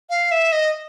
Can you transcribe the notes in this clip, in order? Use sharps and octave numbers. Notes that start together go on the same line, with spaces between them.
F5
E5
D#5